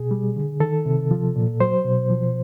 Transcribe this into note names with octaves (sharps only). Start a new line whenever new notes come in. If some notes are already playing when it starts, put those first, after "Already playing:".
Already playing: B2 G#4
G3
D3
D#3 A4
C3
F3
A#2
F#3 C5
B2
F3